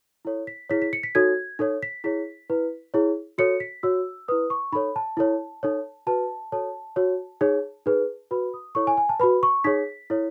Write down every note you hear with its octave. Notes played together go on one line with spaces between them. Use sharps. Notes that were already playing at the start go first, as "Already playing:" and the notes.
E4 A4 C#5
B6
E4 G#4 C#5 B6
B6
C#7
B6
D#4 F#4 A4 C#5 G#6
D#4 A4 C#5
B6
E4 G#4 C#5 B6
E4 B4
E4 G#4 C#5
F#4 A4 C#5 C#7
B6
F#4 C#5 E6
E4 B4 D#6
C#6
D#4 A4 C#5 B5
A5
E4 A4 C#5
D#4 A4 C#5
F#4 B4 A5
F#4 A4 C#5 A5
F#4 C#5
D#4 G#4 C#5
D#4 G#4 B4
F#4 B4 B5
D#6
E4 A4 C#5 C#6
G#5
G#5
A5
F#4 B4 B5
C#6
D#4 G#4 C#5 B6
E4 A4 C#5